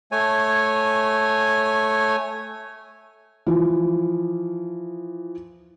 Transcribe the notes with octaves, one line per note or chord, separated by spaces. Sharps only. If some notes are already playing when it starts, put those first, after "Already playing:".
A3 C#5 G#5
E3 F3